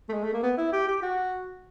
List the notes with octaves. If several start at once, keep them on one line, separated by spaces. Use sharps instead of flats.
A3
G#3
A3
A#3
B3
E4
G4
G4
F#4